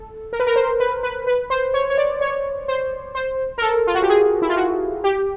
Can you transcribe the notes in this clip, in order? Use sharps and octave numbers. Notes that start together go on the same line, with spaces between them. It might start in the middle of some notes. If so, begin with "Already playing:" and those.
Already playing: A4
A#4
B4
A#4
C5
B4
B4
B4
C5
C#5
C#5
D5
C#5
C5
C5
A#4
A4
F4
F#4
G4
G#4
E4
F4
F#4
G4